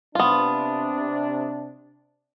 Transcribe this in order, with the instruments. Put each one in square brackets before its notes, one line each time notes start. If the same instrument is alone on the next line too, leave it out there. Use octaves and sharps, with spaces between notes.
[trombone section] C3 D4 [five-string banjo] B3 F4